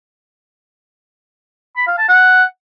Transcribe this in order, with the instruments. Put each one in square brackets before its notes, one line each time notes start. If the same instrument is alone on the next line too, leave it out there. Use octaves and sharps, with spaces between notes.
[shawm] B5
F5
A5
F#5